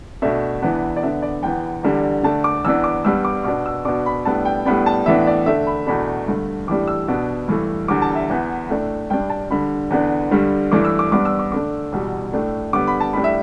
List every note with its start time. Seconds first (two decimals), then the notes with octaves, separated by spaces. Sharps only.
0.22 B2 A3 D4 E5
0.62 E2 E3 B3 D4
0.96 D5
1.03 D3 B3 D4 E5
1.22 D5
1.43 E2 E3 B3 G5
1.83 E2 D3 G3 D4
2.23 D3 A3 D4 A5
2.44 D6
2.65 E2 E3 B3 D4 E6
2.84 D6
3.05 G2 G3 B3 D4 E6
3.25 D6
3.44 B2 B3 D4 D6
3.66 E6
3.85 B2 B3 D4 D6
4.06 B5
4.25 A2 G3 B3 D4 A5
4.45 G5
4.66 A2 G3 B3 D4 B5
4.86 A5
5.06 A2 E3 B3 D4 E5
5.27 D5
5.46 D3 A3 D4 E5
5.67 B5
5.87 E2 B2 A3 D4 B5
6.28 G2 D3 A3
6.68 A2 E3 G3 D4 D6
6.88 E6
7.08 B2 B3 D4
7.48 G2 E3 A3
7.88 E2 D3 G3 D6
8.02 A5
8.15 E5
8.30 E2 E3 B3
8.69 A2 A3 D4
9.10 G2 G3 D4 G5
9.30 A5
9.50 D3 G3 D4 B5
9.91 E2 D3 B3 D4
10.31 G2 D3 G3
10.72 G2 E3 A3 D4 D6
10.85 E6
10.99 D6
11.12 G2 G3 B3 D4 D6
11.25 E6
11.39 D6
11.52 D3 A3 D4 D6
11.92 E2 B2 G3
12.33 A2 A3 D4
12.73 D3 G3 B3 D6
12.87 B5
13.00 A5
13.13 A2 G3 D4 B5
13.24 E5